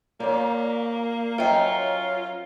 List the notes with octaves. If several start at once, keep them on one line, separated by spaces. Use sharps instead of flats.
A#2 A#3 C#5 D5
F#2 C#4 F4 C5 D#5 E5 G5 A#5